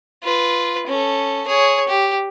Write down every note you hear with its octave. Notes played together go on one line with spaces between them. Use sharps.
F4 B4
C#4 A4
G#4 C#5
G4